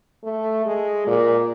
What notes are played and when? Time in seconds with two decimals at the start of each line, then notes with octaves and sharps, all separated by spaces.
0.24 A3
0.66 G#3
1.07 A#2